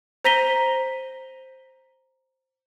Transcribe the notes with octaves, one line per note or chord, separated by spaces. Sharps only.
C5 A#5 A#6 B6 D#7 G7